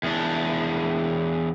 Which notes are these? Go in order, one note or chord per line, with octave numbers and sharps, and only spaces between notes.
E2 D4